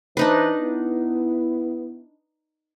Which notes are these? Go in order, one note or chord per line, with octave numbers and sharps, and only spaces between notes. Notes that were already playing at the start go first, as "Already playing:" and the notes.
E3 D4 D#4 B4 C5
B3 E4